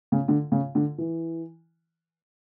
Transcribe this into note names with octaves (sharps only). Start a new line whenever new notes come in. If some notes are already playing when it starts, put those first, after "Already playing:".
C#3
D3
C#3
D3
E3